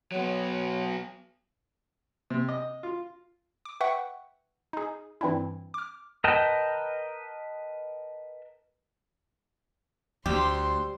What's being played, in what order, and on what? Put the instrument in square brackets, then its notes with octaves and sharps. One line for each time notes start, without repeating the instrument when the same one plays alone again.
[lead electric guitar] F#3 B3 [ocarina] C#5
[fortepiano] C3
D#5
F4
[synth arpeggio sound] D6
B4 E5 F#5 G5 C#6
D#4 G#4
G2 E3 C4 D4 E4
D6 F6
[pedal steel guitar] A#4 B4 D#5 G5 A5
[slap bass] D2 [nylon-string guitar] G3 [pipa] G4 [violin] C5 C6